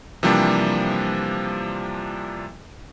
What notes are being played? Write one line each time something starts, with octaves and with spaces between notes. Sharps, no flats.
C3 E3 F3 G3 A#3 D4